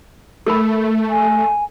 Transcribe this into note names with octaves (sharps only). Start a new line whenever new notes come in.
A3 A4 A#4 B5
G#5